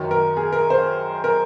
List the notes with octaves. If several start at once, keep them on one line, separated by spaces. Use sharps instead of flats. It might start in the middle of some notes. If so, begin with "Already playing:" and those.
Already playing: F#2 D#3 F#3
A#4
G#4
A#4
C5
A#4